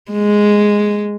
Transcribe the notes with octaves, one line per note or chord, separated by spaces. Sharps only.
G#3